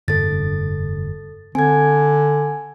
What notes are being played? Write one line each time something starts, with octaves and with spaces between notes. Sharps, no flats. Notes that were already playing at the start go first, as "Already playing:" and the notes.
F1 G2 D3 A4 A6
D3 C4 G#5 G#6